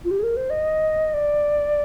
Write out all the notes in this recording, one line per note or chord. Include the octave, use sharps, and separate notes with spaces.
F4
G4
G#4
A#4
C5
D#5
D5